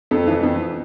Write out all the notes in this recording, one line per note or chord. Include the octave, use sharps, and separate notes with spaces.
F2 A4
E3
F2